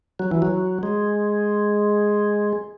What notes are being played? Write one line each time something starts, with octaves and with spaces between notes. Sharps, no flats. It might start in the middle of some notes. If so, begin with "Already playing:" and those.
F#3
E3
F#3
G#3